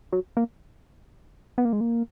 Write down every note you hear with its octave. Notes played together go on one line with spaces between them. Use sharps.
F#3
A#3
B3
A#3
G#3
A#3